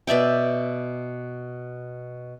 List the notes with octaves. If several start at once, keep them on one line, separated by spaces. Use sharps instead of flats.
B2 D5 E5 G5